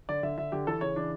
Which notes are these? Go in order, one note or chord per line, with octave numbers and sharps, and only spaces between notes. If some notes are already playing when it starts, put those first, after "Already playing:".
D3 D5
D3 E5
D3 E5
D3 G4
E3 A4
C#3 C#5
E3 D4